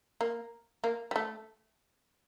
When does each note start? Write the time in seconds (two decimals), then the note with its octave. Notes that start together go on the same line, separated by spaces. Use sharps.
0.21 A#3
0.84 A#3
1.11 G3
1.16 A3